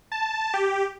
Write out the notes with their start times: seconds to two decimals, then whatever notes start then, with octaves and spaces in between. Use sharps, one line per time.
0.12 A5
0.54 G4